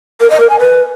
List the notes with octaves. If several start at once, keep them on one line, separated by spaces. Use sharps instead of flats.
A#4
D#5
A#4
G#5
B4